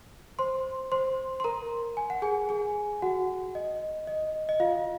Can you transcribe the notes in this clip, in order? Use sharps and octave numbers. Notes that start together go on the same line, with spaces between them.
C5 C6
C5 C6
C6
A#4 A#5
G#5
F#5
G#4 G#5
G#4 G#5
F#4 F#5
D#5
D#5
D#5
F4 F5